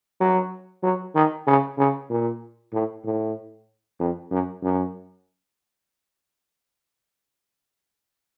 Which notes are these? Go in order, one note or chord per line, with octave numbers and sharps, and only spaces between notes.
F#3
F#3
D#3
C#3
C#3
A#2
A2
A2
F2
F#2
F#2